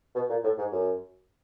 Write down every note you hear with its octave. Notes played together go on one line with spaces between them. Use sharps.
B2
A#2
A2
G#2
F#2